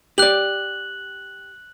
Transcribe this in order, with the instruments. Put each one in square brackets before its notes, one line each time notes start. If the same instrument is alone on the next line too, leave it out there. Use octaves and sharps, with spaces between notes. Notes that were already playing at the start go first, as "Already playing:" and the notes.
[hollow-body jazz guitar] G4 D5 [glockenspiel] F#6 F#7